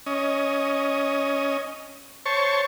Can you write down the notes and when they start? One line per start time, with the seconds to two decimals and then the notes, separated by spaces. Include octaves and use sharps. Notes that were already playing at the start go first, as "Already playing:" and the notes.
0.06 C#4 D#5
2.26 C5 C#5 A5 C#6